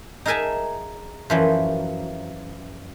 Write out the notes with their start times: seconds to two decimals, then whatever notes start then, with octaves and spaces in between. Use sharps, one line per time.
0.26 D#4 G#4 A#4 E5 G#5 A5
1.30 F#2 E3 F3